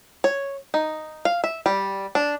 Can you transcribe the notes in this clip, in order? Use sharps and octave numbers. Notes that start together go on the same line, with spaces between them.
C#5
D#4
F5
E5
G3
D4